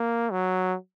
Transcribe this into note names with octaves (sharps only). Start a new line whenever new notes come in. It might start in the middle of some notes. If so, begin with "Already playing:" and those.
Already playing: A#3
F#3